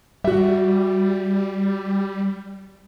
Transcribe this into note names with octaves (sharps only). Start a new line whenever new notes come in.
G3 F#4 E5